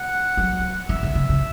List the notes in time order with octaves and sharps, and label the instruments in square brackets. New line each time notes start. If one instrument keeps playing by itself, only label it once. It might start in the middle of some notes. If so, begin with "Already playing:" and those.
Already playing: [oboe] F#5
[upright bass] F#3
[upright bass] E3 [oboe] E5
[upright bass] D3
C#3
C#3